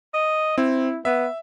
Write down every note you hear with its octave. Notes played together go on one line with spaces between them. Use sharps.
D#5
C4 E4
B3 E5